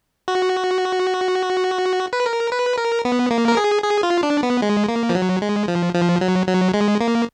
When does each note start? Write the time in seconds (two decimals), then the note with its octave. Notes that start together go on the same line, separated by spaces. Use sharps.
0.28 F#4
2.13 B4
2.26 A#4
2.52 B4
2.77 A#4
3.05 B3
3.31 A#3
3.48 A#4
3.57 G#4
3.83 G#4
4.03 F4
4.23 D4
4.43 B3
4.62 G#3
4.89 A#3
5.09 F3
5.15 F#3
5.42 G#3
5.68 F3
5.94 F3
6.21 F#3
6.47 F#3
6.74 G#3
7.01 A#3